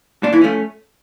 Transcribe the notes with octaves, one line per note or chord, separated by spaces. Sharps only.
A#2 D4
E3 E4
F3 A3 C#4